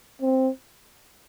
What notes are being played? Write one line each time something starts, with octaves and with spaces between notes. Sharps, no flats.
C4